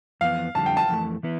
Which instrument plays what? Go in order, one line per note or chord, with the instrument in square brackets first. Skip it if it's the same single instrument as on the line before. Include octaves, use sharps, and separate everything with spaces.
[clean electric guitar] F2 E3 B3 [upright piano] F5
[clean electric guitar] F2 D3 G3 [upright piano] A5
[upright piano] G5
A5
[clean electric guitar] F2 E3 A3
E3 B3 E4 B4